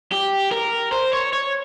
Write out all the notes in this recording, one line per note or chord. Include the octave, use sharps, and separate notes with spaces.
G4
A#4
C5
C#5
C#5